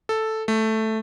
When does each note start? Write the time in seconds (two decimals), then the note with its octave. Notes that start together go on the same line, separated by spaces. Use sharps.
0.09 A4
0.48 A3